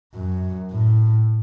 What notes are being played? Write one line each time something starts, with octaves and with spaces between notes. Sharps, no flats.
F#2
A2